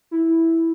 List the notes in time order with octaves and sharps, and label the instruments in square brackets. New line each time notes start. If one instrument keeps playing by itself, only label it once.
[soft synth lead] E4